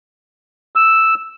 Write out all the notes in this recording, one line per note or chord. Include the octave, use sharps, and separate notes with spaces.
E6